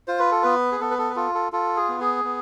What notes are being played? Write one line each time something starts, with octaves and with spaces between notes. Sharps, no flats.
F4 C5
B4
A4
B3 B4
G#4
B3 A4
B4
A4
B4
F4 A4
A4
F4 A4
G#4
B3
G#4
B3